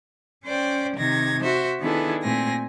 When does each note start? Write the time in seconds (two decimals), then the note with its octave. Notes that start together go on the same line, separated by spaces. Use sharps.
0.45 C#4 C5 D5 G5
0.96 C3 D#3 G#6 A#6
1.43 F#4 C5 E5
1.80 D#3 B3 D4 E4 G#4 A4
2.23 A#2 A3 C4 G#5 A#6